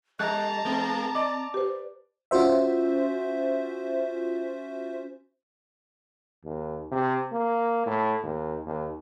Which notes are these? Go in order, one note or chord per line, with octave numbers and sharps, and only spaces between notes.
G3 D#5 A5 A#5 F#6
G#3 B3 C4
D5 D#5 D6
G4 B4 C5
C#4 F4 F#4 C5 E5
D#2
C3
A#3
A2
D#2
D#2